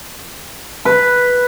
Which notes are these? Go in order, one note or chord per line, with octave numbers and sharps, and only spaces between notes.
B4